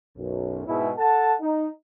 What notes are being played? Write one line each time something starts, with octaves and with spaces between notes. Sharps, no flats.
B1 F#2
G#2 B2 G#3 B3 E4
A4 F#5 A5
D#4